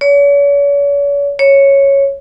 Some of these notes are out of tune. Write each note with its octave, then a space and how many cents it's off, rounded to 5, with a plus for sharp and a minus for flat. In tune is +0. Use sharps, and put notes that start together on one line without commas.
C#5 +40
C#5 -5